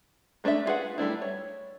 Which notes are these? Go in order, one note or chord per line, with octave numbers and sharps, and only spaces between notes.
G#3 A3 D4 B4 E5
D4 F4 G#4 B4 F#5
G3 A3 D4 E4
C#5